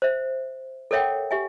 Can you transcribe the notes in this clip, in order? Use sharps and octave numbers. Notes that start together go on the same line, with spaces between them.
C5 E5
A4 A#4 C#5 E5 F#5 G5
G4 E5 G#5